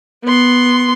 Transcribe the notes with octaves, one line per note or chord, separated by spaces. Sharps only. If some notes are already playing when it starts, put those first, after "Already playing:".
B3 C6